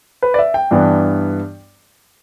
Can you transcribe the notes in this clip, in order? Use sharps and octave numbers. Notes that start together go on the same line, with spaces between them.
B4
D5
E5
G5
G2 E3 B3 D4